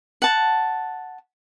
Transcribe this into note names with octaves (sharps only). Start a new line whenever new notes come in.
F#5 A5